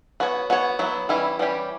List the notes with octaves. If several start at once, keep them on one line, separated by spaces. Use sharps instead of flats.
B3 F#4 C#5
B3 F#4 C#5
F#3 B3 E4
E3 G3 C#4 E4
E3 G3 C#4 G4